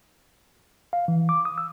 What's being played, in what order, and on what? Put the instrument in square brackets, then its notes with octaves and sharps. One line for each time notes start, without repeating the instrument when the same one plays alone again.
[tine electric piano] F5
E3
D6
D#6
E6